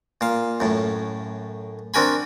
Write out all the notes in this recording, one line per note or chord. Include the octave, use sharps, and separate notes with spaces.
A#2 F5
F#2 A2
C4 D4 F#4 A#4 G#5 B5